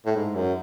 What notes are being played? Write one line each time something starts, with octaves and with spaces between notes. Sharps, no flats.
A2
G#2
F#2